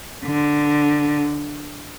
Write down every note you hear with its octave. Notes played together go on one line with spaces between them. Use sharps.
D3